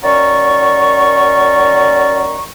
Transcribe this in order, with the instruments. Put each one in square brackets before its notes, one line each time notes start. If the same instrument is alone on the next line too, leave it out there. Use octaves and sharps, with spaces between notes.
[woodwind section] D#3 F#3 C#4 D5 A#5 C#6